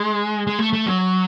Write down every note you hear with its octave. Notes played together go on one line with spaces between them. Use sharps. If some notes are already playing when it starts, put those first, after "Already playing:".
Already playing: G#3
G#3
A3
A3
F#3